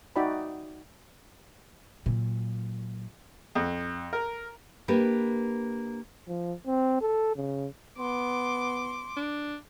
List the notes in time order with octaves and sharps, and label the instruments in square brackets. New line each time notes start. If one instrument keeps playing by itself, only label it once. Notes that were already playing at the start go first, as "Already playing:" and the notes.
[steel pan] D#4 F#4 D5 E5 G5 B5
[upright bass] A#2 F#3
[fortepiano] F2
A#4
[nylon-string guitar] A#3 D4 G4 B4
[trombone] F3
C4
A4
C#3
[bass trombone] B3 [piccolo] C6 [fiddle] D6
[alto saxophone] D4